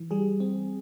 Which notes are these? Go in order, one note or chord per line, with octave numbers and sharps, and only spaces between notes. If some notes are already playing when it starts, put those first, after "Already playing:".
Already playing: E3
G3 G#4
C4